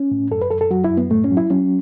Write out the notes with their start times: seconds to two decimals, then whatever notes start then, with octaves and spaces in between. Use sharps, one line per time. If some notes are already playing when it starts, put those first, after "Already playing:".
Already playing: C#4
0.11 A2
0.31 F#2 A4
0.42 B4
0.50 F#2 A4
0.61 A4
0.71 F#3 F#4
0.84 E4
0.91 F#2
0.97 B3
1.11 A2 A3
1.24 C#4
1.31 F#3
1.37 E4
1.50 F#3 C#4